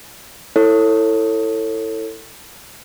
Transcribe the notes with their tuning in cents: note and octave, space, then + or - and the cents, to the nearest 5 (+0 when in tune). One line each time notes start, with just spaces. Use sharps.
E4 +0 A4 +20 C#5 -15